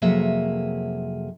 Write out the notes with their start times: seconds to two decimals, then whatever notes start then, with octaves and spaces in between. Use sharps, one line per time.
0.02 F2 C3 F#3 A#3 G#4 E5